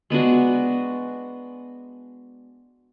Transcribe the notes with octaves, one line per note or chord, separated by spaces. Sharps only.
G#3 B3 D4 F#4